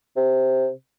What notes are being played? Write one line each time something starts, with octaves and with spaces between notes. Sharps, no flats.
C3